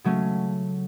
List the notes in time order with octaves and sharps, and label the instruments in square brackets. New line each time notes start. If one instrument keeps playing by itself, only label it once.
[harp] C#3 F#3 A3 C#4